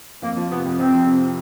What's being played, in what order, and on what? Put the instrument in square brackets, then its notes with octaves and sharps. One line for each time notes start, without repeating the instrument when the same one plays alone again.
[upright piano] F2 [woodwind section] A#3
[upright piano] F3
[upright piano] C3 [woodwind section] B3
[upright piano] F2
[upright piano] F2 [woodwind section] C4
[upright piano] F3
C3